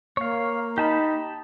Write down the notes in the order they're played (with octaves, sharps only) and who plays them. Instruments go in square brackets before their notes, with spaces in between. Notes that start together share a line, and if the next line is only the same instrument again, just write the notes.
[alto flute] A#3 [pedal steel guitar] C#5 F5
[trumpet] D#4 [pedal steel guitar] G4 A5 B5